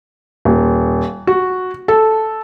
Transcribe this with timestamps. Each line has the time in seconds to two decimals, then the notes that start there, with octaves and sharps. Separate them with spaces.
0.45 D#1
1.27 F#4
1.88 A4